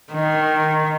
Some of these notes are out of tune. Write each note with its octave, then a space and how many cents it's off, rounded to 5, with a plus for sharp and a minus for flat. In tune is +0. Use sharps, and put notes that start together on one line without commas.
D#3 -5